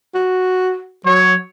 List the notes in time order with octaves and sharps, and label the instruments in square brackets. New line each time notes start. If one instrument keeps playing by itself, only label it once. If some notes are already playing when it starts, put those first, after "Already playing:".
[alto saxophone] F#4
[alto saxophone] F#3 [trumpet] C#5